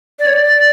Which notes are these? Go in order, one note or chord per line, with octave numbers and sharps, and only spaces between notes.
D5
C#5
D5